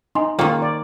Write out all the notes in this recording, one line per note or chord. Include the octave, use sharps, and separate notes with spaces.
D#4 G#5 C6
D#3 A#3 F4 C5 G5 C#6
D5